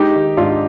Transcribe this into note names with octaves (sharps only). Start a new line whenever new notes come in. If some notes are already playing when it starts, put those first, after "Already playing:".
Already playing: G#3 D#4 G4
D#3
G#2 D4 F4